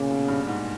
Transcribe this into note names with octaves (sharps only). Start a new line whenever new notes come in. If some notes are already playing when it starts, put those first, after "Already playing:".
Already playing: A#2 C#3
B2
G2
G#2